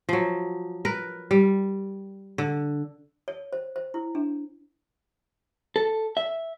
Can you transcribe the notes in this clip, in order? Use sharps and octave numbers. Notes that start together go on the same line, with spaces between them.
F3 F#3
A#4 B4
G3
D3
C#5
C5
C5
E4
D4
A4
E5